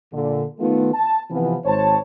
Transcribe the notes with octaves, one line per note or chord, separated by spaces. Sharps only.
A#2 D3
D#3 A3 B3 F4
A5
C3 E3 F3 B3
G#1 C5 C#5 A5